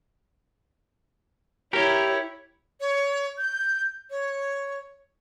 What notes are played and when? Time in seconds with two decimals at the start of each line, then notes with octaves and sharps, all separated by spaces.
1.73 E4 G4 A#4 C#5
2.80 C#5
3.38 G6
4.10 C#5